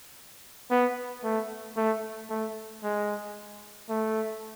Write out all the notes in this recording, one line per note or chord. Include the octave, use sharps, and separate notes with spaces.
B3
A3
A3
A3
G#3
A3